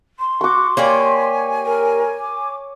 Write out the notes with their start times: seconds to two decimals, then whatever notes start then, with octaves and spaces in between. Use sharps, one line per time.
0.19 C6
0.41 F#4 C#6 D6
0.77 A#3 G4 C#5 D5 G#5
1.65 A#4
2.19 D6